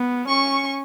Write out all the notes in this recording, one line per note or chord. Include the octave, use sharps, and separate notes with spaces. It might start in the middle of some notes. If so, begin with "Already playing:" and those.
Already playing: B3
C#4 C#6